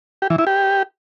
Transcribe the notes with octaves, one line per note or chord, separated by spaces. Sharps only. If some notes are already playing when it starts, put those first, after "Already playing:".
G4
E3
E4
G4